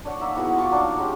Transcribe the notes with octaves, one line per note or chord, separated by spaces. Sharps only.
D4 C#5 F#5
A#3 D#4 E5 F#5
B3 E4 F#4 G#4
F4 A5 C#6 D6
F#3 A#3 D4 D#4
G#3 C#4 F#4 G4